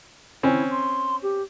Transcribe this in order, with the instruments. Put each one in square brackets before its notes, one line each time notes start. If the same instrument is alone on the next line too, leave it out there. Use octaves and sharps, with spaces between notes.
[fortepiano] C4 C#4 [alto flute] E4
[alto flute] C6
G4